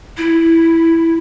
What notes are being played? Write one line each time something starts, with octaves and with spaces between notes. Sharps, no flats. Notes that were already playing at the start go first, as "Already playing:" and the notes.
E4